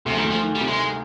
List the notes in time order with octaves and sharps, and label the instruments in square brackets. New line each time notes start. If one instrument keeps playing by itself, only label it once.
[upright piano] D2 [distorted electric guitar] C3
[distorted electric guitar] F3
D#3
[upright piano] D2
[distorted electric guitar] F3
[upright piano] D#3
[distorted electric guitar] G3
[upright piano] C3
[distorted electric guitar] G#3